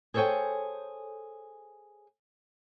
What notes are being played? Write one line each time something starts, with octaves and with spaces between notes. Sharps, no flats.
G#4 A4 C5 C#5 G5 G#5